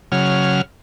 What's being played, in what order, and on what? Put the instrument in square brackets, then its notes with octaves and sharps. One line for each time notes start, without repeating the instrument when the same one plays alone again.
[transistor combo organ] C#3 F#3 F6